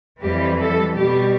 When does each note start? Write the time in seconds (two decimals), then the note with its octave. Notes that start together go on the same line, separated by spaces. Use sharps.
0.21 F2 E3 G3 G4
0.58 A4
0.95 B2 G3 G4